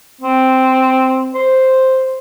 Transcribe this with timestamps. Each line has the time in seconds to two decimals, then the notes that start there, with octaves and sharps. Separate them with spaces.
0.21 C4
1.35 C5